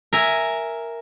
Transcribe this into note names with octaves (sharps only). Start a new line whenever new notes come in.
A#4 E5 G#5